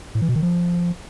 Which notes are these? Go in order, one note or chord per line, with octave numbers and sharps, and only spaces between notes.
A2
E3
B2
D#3
F3